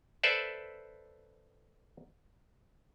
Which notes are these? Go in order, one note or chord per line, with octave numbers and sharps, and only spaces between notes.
A4 B4 C5 D5 E5